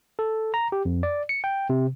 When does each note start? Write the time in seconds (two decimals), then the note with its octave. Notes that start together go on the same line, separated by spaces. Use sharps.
0.19 A4
0.54 A#5
0.72 G4
0.85 F2
1.03 D5
1.29 C#7
1.44 G5
1.70 C3